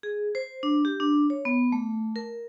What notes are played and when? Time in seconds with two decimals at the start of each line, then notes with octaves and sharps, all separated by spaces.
0.03 G#4
0.35 C5
0.63 D4
0.85 G4
1.00 D4
1.30 C#5
1.45 B3
1.72 A3
2.16 A#4